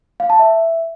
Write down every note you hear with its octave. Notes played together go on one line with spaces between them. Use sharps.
F5
A5
E5